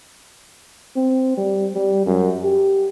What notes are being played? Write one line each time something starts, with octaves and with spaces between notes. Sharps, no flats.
C4
G3
G3
F#2
G4